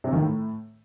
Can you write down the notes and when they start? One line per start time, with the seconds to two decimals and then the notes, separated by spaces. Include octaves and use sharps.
0.04 C3
0.13 D#3
0.21 A2